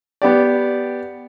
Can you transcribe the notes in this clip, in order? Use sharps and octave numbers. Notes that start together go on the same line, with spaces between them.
B3 G4 D5